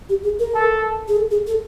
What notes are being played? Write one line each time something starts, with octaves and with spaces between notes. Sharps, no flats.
G4
G#4
A#4
A4
G#4
A4
G#4
A4